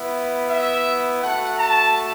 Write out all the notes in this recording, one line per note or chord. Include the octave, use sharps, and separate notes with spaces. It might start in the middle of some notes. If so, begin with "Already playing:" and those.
Already playing: B3 E4
E5
A3 F#4 F#5
A5